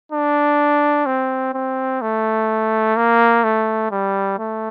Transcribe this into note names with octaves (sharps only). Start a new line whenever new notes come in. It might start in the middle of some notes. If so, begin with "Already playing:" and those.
D4
C4
C4
A3
A#3
A3
G3
A3